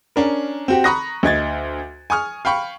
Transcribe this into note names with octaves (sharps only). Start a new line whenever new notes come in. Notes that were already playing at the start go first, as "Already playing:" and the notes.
C#4 D4 A#4
C4 F#4 G4
A#5 B5 C#6 D#6 F#6 A#6
D2 D#5 G#6 A6
G#5 C#6 D#6 F6
F5 G5 B5 C#6